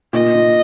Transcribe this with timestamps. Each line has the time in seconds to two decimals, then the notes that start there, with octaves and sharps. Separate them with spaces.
0.13 A#2 D#5
0.34 A#2